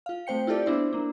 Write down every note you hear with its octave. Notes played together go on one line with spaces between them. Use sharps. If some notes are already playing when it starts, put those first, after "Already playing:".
F4 F5
A3 C4 C5 G5 C#7
E4 F4 G4 A4 D5
B3 D4 E4 C5
A#3 D4